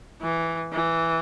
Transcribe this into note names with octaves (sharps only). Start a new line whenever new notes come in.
E3
E3